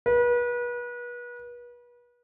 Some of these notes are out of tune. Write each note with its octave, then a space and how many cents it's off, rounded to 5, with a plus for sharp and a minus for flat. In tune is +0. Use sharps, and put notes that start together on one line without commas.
B4 -35